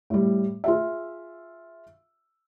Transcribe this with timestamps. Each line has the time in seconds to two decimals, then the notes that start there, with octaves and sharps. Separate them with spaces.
0.10 A2 G3
0.64 F4 G#4 E5